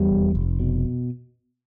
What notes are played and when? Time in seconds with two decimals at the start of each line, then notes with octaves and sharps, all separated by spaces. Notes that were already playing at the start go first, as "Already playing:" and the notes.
Already playing: E2 G3
0.10 F1
0.35 F1
0.60 B2